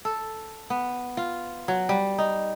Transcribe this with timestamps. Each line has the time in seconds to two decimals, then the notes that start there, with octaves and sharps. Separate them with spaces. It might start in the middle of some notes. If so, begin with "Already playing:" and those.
0.05 A4
0.70 B3
1.17 F4
1.68 F#3
1.89 G3
2.18 D#4